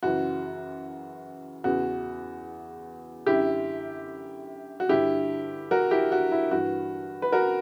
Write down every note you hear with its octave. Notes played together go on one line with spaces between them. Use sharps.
F#2 C#3 E3 F#4
E2 C#3 E3 F#4
F#2 D3 E4 G4
F#4
G2 D3 E4 G4
F#4 A#4
E4 G4
F#4
E4
G2 E3 F#4
B4
F#4 A#4